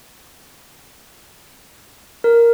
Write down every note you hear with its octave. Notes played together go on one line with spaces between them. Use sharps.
A#4